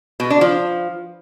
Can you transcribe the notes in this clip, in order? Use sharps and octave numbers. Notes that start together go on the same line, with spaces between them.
B2
D4
F3